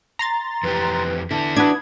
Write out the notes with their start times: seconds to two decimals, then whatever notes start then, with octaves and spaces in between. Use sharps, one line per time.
0.19 A#5 C6 A6
0.63 F2 E3 G4 B4
1.31 D3 B3 E4 A5
1.56 D4 F#4 B4 D#6 G#6